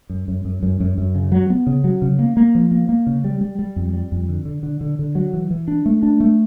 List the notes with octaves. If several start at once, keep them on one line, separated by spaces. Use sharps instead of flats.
F#2
F#2
F#2
F#2
F#2
F#2
C#3
F#3
B3
C#3
F#3
C#3
A#3
A#3
F3
A#3
A#3
C#3
G3
G3
G3
F2
G3
F2
D3
D3
D3
D3
D3
F#3
E3
E3
D4
A3
D4
A3